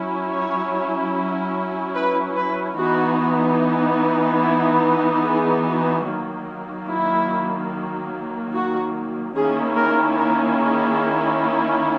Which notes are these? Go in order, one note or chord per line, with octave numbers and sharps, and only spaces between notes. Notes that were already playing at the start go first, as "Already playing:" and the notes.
Already playing: F#3 C#4 E4
C#5
B4
B4
E3 B3 D#4 F#4
E4
G#4
F#4
D#3 F#3 A#3
E4
F#4
D#3 A#3 C#4 E4 G#4
A#4
A#4
G#4